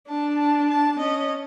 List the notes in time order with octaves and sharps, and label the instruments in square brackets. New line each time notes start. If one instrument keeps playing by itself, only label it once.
[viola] D4 [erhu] A5
[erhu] A5
A5
[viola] C#4 [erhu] D#5